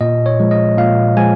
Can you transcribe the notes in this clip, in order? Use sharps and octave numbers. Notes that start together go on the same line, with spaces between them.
A#2 D#5
C#5
F3 G#3
D#5
A#2 F5
F3 G#3 G#5